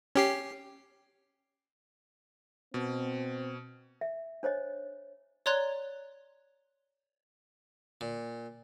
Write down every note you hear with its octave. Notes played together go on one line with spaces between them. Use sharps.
C#4 G4 C7
B2 C4
E5
D4 C5 C#5 D#5
C#5 D5 A#5 C6 F#6 G#6
A#2